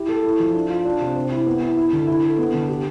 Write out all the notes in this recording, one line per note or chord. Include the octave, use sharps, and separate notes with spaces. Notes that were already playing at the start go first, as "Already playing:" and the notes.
Already playing: E4 G4
A4
E4
F3
D4
F4
D4
C3
C4
E4
B3
E4
E4
D3
E4
A4
B3
D3
G4